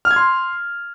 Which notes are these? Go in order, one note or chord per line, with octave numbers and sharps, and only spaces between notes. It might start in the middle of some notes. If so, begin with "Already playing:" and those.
F6
G#6
C6